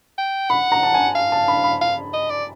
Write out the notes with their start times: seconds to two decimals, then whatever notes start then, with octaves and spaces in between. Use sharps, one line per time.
0.18 G5
0.50 F#5 B5
0.72 A#5
0.83 A5
0.94 G#5
1.16 F5
1.32 A5
1.48 B5
1.64 B5
1.81 F5
2.14 D#5
2.30 D5